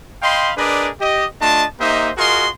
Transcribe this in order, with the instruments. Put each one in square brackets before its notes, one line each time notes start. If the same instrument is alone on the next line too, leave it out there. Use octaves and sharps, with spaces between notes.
[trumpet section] D#5 F5 G5 B5 C6
D4 G#4 A#4 B4 D5 D#5
G4 D#5
A3 D4 F4 D#5 A5
A#3 D#4 G4 C5 D#5 E5
F4 F#4 G#4 A#4 D#5 C6